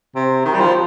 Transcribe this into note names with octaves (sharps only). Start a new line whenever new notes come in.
C3
D#3
G3
F3